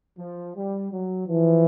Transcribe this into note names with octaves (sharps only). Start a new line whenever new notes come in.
F3
G3
F#3
E3 F3